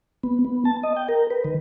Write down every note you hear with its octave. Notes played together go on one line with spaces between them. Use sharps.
B3
B3
A5
D#5
G5
A#4
B4
D#3